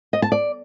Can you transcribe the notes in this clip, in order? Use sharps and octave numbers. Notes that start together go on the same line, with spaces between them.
D#5
A5
D5